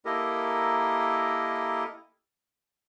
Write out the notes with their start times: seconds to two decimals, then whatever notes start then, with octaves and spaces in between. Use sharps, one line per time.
0.05 A#3 E4 G4 A4 A#4 D#5